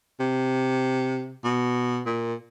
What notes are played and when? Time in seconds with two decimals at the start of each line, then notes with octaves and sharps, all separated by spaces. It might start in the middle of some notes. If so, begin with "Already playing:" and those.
0.20 C3
1.44 B2
2.06 A#2